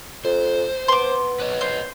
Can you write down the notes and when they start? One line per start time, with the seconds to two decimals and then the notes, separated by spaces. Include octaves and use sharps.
0.25 F2 C5
0.88 B3 C6 D6
1.40 B4 C#5 D#5
1.61 C5